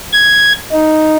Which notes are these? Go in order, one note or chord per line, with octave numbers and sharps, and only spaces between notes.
G#6
D#4